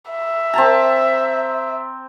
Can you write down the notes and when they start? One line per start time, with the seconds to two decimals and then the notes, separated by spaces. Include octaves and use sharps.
0.11 E5
0.54 C4 A5 A#5